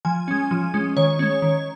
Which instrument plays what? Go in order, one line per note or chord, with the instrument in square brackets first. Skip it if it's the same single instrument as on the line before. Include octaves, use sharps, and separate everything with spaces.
[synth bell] F3 G#5
G#3 C#4
F3
G#3 C#4
D#3 C#5
G#3 C#4
D#3